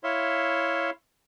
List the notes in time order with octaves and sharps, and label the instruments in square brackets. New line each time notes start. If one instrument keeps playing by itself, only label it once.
[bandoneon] E4 C#5 E5 F5 C6